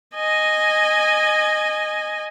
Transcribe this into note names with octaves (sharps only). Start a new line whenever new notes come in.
D#5 G#5